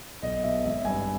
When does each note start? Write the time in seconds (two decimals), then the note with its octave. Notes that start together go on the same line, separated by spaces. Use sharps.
0.22 B1 D#5
0.43 B2 E5
0.65 G#1 E5
0.85 G2 G#5